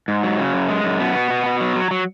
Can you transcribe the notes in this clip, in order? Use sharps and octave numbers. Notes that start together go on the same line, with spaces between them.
G#2
F#3
C#3
F#2
G#3
F#2
B2 B3
B2
B2
B2
F#3
F#3
F#3